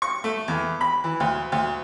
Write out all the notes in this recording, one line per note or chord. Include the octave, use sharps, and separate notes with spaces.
C#6
A3
E2
B5
E3
D2
D2